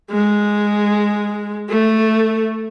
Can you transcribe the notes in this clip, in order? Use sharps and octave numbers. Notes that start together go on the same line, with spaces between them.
G#3
A3